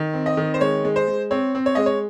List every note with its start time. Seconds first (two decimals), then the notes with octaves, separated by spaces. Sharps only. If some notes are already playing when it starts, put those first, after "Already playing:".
Already playing: D#3
0.13 C4
0.26 D#5
0.37 D#3
0.54 C5
0.61 G#3 C#5
0.85 G#3
0.96 C5
1.08 G#3
1.31 C4 C#5
1.55 C4
1.66 C#5
1.75 G#3 D#5
1.86 C#5